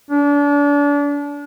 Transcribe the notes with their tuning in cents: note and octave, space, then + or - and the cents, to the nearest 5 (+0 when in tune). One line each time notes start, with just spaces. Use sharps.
D4 -30